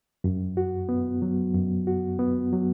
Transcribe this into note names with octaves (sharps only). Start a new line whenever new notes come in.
F#2
F#4
B3
F#3
F#2
F#4
B3
F#3